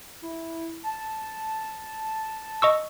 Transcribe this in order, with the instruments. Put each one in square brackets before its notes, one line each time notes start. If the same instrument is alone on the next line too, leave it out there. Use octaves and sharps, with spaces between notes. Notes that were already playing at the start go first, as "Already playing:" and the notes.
[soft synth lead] E4
A5
[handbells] D#5 C#6 E6